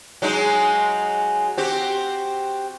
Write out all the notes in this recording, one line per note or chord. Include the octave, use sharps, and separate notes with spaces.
F#3 G#3 D#4
C4 F#4 G4